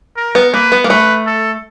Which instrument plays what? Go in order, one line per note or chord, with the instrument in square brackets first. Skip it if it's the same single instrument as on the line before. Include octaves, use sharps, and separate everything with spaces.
[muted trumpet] A#4
[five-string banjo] B3
[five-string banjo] A#3 [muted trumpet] B4
[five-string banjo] B3
A#3
[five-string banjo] A3 [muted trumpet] B4
[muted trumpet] A4